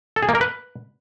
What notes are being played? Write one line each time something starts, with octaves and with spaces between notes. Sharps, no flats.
A4
G#4
A#3
A#4
B4